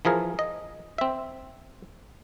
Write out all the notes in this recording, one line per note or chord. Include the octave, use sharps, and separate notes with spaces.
E3 F3 G#4 A#4
D#5
C4 E5